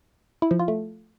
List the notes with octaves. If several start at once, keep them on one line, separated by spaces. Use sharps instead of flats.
E4
F3
F4
A3